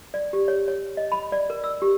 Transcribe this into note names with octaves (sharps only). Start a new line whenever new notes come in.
D5
G4
C#5
C#5
D#5
B5
D5
A#4
E6
G4